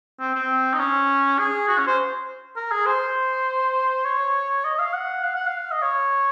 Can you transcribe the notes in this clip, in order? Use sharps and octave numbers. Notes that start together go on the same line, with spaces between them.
C4
C4
D#4
C#4
G#4
F#4
C#4
C5
A#4
G#4
C5
C#5
D#5
F5
F#5
F5
F#5
F5
D#5
C#5